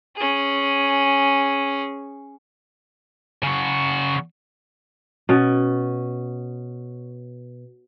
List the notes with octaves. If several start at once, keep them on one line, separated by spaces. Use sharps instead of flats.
C#4 G#4
C#3 F#4
B2 C#4